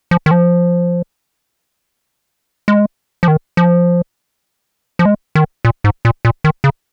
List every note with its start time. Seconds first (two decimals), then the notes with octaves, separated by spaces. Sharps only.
0.11 F3
0.26 D#3
0.31 F3
2.68 G#3
3.23 F3
3.28 D#3
3.57 F3
4.99 F3
5.06 G#3
5.35 D#3
5.65 A#2
5.84 G#2
6.05 A#2
6.25 A#2
6.44 D#3
6.64 C#3